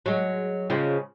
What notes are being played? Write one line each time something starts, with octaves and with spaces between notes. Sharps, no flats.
F#3 G#3
C#3 F3 G#3